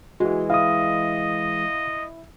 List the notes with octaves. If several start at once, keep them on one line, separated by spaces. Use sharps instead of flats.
E3 G#3 F#4
E4 D#5 F5 D#6